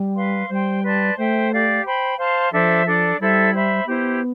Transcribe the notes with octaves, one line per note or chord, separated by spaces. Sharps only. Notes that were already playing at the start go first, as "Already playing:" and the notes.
Already playing: G3
B4 F5 C6
G3 C5 G5 C6
B4 D5 A5 C6
A3 C5 E5 G5
G4 D5 F5
C5 G5 B5
C5 F5 A5 C6
F3 D4 A4 C5 E5
D4 A4 D5
G3 E4 A4 C5 E5
C5 E5 B5
B3 E4 G4 C5